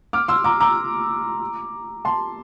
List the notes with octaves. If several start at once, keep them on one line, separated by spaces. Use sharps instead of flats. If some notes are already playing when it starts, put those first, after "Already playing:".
D6 F6
C6 E6
A#5 D6
A#5 D6
A5 C6